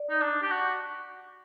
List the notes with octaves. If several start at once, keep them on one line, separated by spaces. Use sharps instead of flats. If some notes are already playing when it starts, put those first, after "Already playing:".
Already playing: D5
D#4
D4
G4
F#4